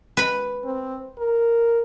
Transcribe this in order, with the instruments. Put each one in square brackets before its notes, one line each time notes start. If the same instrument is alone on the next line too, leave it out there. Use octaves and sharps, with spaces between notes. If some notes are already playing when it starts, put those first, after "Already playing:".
[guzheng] B4 B5
[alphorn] C4
A#4